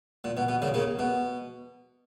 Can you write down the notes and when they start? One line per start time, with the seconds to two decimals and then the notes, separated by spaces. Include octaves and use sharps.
0.24 A#2
0.37 B2
0.49 B2
0.62 A#2 C#3
0.74 A#2 C#3
0.99 B2